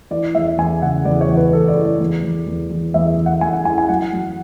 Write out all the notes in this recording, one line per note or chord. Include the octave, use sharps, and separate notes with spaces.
E3 D5
E2 E5
E2 G#5
C#3 F#5
E2 D5
C#5
E2
B4
E2 A4
D5
E3
D5
E2
E2
E2
E2
E2 E5
E2
F#5
E2 G#5
F#5
E3 G#5
G#5
F#3 F#5
F#3